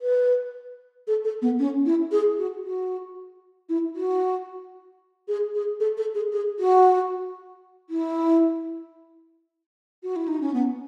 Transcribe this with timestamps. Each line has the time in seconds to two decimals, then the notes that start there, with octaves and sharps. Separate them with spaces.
0.01 B4
1.07 A4
1.24 A4
1.42 B3
1.59 C#4
1.86 E4
2.12 G#4
2.39 F#4
2.65 F#4
3.69 E4
3.96 F#4
5.28 G#4
5.54 G#4
5.80 A4
5.97 A4
6.15 G#4
6.32 G#4
6.59 F#4
7.90 E4
10.03 F#4
10.16 E4
10.28 D#4
10.41 C#4
10.53 B3